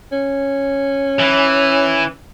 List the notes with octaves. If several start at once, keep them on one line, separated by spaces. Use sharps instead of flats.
C#4
E3